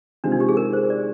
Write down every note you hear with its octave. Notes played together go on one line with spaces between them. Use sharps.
C3 D#3 G#3 C4 D4 F4
D#4
G4
G#4
A#4
C5
D5